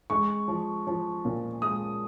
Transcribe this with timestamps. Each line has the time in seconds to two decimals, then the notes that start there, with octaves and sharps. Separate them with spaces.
0.10 G#3 C#6
0.48 F3
0.87 F3
1.25 A#2
1.62 G#3 D#6